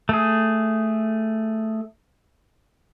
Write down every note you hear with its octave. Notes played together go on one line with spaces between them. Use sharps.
A3 G#4